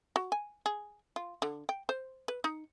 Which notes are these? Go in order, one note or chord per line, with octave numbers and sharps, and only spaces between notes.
F#4
G#5
G#4
F4
D3
G5
C5
B4
D#4